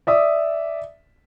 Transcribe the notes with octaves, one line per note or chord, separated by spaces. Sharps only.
D5 E5 D#6